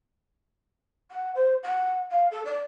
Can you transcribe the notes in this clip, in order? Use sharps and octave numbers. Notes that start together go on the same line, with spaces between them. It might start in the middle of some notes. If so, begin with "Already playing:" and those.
F#5
C5
F#5
F5
A4
D5